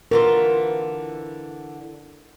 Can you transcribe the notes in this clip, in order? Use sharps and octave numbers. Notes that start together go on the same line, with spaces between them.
D3 E3 F4 A#4